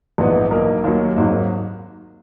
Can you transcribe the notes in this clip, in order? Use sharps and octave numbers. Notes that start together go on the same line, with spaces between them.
A#1 G#2 E3 B3 D#4
B1 B2 A#3 D#4 A#4
D#2 D#3 F#3 A#3
G#1 G#2 F#3 A#3 D#4